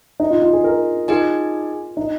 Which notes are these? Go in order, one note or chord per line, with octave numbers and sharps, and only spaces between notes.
D#4
F4
F4
G#4
A#4
D#4 F4 G#4 D#5 G#5
D#4